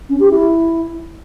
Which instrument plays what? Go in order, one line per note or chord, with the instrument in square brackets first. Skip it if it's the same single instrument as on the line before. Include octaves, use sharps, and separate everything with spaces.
[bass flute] C#4
G4
E4